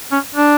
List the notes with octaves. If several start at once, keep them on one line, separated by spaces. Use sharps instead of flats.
C#4
D4